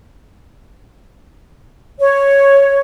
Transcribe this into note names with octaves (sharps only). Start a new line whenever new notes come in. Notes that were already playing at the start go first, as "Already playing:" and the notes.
C#5